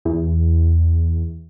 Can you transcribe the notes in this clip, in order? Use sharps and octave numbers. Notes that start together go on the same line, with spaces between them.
E2